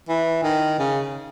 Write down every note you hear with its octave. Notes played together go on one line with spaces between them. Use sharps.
E3
D#3
C#3